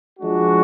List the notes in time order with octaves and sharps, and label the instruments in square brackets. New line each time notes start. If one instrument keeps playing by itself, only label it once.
[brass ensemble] F3 G#3 D4 F#4